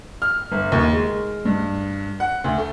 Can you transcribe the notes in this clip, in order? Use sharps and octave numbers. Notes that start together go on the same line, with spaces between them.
F6
G1
D#2
G#3
G2
F#5
D2
A3